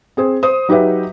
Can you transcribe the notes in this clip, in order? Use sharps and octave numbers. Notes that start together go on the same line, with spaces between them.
C4 G#4 C5
C5 D#6
F#3 D#4 G4 B4 E5